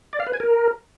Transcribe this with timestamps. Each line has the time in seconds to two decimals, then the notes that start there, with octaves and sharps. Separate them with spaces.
0.13 D5
0.20 F5
0.26 B4
0.33 G#5
0.40 A#4